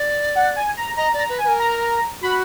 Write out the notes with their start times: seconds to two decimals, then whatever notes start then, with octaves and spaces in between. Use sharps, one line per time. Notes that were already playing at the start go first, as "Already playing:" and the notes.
Already playing: D5
0.35 F#5
0.56 G#5
0.77 A#5
0.97 D#5 A#5
1.13 D5 A#5
1.29 B4
1.38 G#5
1.44 B4
1.48 A#4
1.60 A#5
2.22 F#4 B5